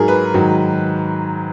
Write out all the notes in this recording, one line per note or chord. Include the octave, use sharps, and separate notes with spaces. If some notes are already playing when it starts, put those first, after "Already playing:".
Already playing: G#2 F#3 G#4 A#4
B4
G#2 D#3 F#3